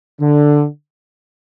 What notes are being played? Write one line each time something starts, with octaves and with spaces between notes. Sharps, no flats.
D3